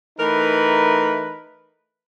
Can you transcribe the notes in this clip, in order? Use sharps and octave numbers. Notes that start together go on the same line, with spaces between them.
E3 A3 D#4 A#4 B4